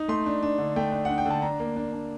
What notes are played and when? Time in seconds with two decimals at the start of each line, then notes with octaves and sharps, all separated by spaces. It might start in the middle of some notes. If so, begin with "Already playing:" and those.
Already playing: D#4
0.08 A3 C6
0.26 D4
0.43 D4
0.58 D3
0.76 A3 G5
0.92 D4
1.05 D4 F#5
1.18 G5
1.26 D3 A5
1.42 D4 A#5
1.60 A#3
1.76 D4
1.92 D4